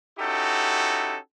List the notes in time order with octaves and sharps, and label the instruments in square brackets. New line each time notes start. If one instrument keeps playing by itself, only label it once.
[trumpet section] C#4 D#4 E4 F#4 G4 A4